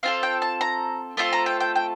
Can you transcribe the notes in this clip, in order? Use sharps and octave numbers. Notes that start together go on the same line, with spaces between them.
C4 F4 A4 F5
G5
A5
A#5
A3 C4 F4 A4 A5
A#5
G5
G5
G5